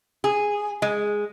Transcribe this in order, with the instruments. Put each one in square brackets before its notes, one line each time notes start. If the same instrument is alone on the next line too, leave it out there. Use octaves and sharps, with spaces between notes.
[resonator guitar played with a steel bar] G#4
G#3